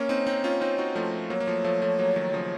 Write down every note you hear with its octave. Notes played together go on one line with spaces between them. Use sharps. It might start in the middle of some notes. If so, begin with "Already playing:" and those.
Already playing: A#3 C#4 C#5
C4 D#4
C4 D#4
C#4 F4
C4 D#4
D#4 F#4
F3 A3
F#3 A#3 C#5
A#3
F3 A3
F3 A3
F3 A3
F#3 A#3
D#3 F#3
C#3 F3